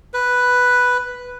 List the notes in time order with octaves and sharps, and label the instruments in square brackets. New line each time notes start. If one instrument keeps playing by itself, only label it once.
[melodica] B4